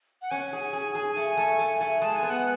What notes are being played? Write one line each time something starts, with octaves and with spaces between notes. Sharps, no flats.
F#5
C#4 G#5
G#4
G#4
G#4
A3
A3
A3
A3
G#3 A5
G#5
B3
F#5